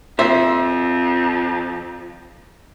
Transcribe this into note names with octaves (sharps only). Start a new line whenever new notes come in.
F2 C5 E5